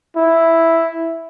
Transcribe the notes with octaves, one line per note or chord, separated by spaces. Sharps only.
E4